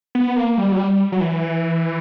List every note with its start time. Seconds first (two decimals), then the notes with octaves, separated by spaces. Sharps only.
0.15 B3
0.36 A#3
0.57 G3
0.72 F#3
0.78 G3
1.12 F#3
1.21 E3